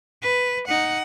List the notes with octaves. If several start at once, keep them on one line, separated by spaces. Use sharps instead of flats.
B4
D#4 F#5